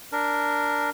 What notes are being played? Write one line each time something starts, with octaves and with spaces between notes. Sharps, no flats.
D4 A#4